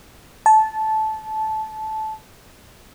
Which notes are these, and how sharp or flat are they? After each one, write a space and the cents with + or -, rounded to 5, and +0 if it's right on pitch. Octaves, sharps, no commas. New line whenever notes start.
A5 -15